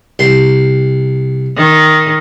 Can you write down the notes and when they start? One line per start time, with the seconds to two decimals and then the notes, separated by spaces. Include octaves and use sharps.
0.19 C2 C6
1.57 D#3